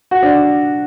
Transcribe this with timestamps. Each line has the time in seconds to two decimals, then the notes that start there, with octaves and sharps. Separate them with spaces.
0.11 F#4
0.23 D4